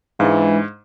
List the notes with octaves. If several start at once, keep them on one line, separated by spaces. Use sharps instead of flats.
G#2 E3 G#3 D4 F5